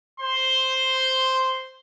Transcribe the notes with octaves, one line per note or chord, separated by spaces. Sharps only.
C5 C6